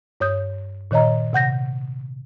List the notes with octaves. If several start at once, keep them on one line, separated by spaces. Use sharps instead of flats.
G2 C#5 D#6 G6
A#2 D#3 C#5 D#5 A#5
C3 F#5 G6 A#6